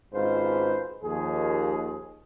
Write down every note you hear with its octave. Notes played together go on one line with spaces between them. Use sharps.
G#1 G#2 C#4 F4 B4 C5
D#2 F3 G#4